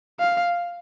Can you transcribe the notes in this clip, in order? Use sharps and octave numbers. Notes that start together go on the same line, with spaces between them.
F5